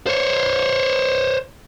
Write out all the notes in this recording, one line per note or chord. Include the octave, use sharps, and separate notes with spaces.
C5 C#5